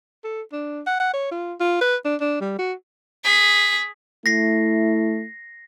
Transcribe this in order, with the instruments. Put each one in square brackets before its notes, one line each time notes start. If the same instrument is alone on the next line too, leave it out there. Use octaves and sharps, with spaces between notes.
[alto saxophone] A4
D4
F#5
F#5
C#5
F4
F4
B4
D4
D4
G3
F#4
[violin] G#4 B6
[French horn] A3 [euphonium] E4 [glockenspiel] A#6 C7